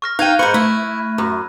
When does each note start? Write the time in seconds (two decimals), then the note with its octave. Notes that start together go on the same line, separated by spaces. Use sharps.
0.02 C#6 F6 A#6
0.19 D#4 F5 G5 F#6 G#6 D#7
0.39 G#2 C5 B5 C#6 F#6 C#7
0.54 A3 E4
1.18 F#2